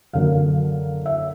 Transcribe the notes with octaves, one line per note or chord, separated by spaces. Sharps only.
F#2 D3 F#3 A#3 F5
E5